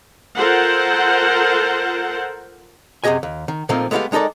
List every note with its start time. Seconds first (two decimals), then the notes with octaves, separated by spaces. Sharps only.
0.36 F4 A4 A#4 C5 F#5
3.04 F#2 C3 G4 G#4 D#5 G#5
3.23 D#2
3.48 D#3
3.69 A#2 D#3 F3 A3 A#3 C4
3.91 G#3 A3 B3 D#4 G4 F5
4.12 G#3 D#4 A4 A#4 D5